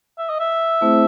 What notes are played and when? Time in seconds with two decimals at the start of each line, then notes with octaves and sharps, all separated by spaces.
0.18 E5
0.29 D#5
0.40 E5
0.81 A3 C4 E4 G#4 C5